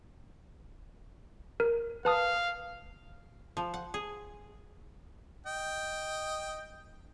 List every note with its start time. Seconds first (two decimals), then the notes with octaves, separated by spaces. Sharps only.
1.60 A#4
2.05 B4 F5 A5 D#6
3.57 F3
3.74 F#5
3.94 G#4
5.46 D#5 G5